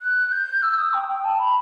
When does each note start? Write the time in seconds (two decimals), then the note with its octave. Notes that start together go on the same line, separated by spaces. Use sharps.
0.02 F#6
0.31 G6
0.62 E6
0.78 D#6
0.93 G5
1.08 G5
1.24 A5
1.39 B5